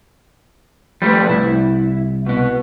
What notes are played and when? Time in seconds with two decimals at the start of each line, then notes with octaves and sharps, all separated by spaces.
1.02 F3 G3 A3 B4
1.29 C2 E4
2.26 B2 B3